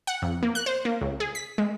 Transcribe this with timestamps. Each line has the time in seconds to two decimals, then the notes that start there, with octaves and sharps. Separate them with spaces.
0.07 F#5
0.22 F2
0.43 A#3
0.55 F#6
0.66 C5
0.85 A#3
1.01 C#2
1.20 G#4
1.35 B6
1.58 G#3